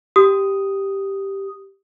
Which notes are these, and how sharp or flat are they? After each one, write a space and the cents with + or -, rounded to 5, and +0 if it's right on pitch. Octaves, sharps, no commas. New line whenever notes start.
G4 +0 D#6 +0